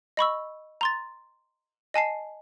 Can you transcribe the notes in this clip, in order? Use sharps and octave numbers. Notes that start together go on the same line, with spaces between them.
D#5 B5 C#6 E6
A#5 C6 A6
D#5 G#5 A5 C7